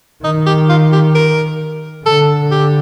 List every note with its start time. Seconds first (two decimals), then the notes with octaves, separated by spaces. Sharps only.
0.24 D#3 D#4
0.46 G4
0.69 F4
0.92 G4
1.15 A#4
2.06 D3 A4
2.51 G4